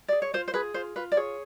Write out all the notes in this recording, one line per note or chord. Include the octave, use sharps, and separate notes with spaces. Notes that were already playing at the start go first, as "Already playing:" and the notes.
G#4 D5
C#5
F4 C5
C5
G#4 B4
F4 C5
F4 B4
D5
G#4 C#5